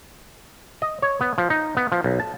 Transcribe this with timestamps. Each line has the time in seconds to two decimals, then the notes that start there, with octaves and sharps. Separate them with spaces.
0.82 D#5
1.02 C#5
1.21 B3
1.38 F3
1.50 D#4
1.77 B3
1.92 F3
2.04 B1
2.20 A5